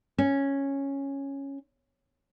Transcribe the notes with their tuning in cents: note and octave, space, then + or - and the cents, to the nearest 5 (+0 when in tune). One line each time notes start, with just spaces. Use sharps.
C#4 -5